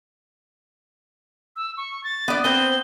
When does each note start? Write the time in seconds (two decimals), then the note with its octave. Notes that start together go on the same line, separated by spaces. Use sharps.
1.56 E6
1.77 C#6
2.04 A6
2.28 B3 D5
2.44 B3 C4 C5 G7